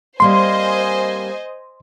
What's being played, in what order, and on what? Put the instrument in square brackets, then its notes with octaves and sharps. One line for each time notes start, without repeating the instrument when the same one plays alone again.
[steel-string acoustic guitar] G3 A#3 C4 [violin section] C5 D#5 G#5 [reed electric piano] C6